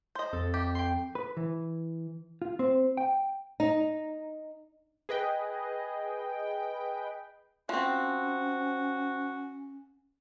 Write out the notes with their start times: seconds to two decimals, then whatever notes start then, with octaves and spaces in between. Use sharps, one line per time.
0.15 C5 D#5
0.33 F2 A4
0.54 G4
0.75 G5 C6
1.15 B4
1.37 E3
2.42 F4
2.59 C4
2.97 G5
3.60 D#4
5.09 G#4 B4 D#5 G5
7.69 F3 C4 C#4 F#4